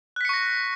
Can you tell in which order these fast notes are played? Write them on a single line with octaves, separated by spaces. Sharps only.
F#6 B6 C#7 C#6 A#6